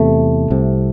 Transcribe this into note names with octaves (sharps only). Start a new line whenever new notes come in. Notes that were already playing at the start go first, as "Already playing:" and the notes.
Already playing: E2 C3 A3
C2 C3